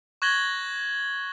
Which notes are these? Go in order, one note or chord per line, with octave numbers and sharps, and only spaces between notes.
C#6 F#6 G#6 A#6 F#7 G7